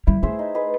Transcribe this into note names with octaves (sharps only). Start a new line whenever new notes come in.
G3 E4
A3 G#4 C5 E5
D#4
G#4 B4 D#5